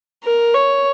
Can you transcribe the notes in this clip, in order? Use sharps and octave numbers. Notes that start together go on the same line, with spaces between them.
A#4
C#5